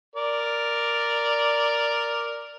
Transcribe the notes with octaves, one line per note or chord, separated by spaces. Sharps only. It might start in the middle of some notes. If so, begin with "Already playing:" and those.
A#4 D5